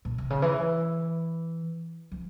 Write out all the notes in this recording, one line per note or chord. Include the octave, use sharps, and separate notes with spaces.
A#2
C3
C#3
E3
F3